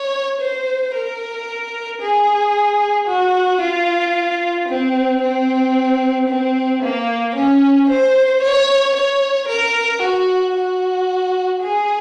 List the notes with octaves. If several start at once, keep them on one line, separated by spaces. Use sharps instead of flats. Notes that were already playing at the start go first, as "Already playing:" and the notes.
Already playing: C#5
C5
A#4
G#4
F#4
F4
C4
C4
C4
A#3
C#4
C5
C#5
C#5
A#4
F#4
F#4
G#4